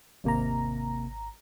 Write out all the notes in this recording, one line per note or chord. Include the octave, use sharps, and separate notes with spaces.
G#1 D#2 C3 A#3 A#5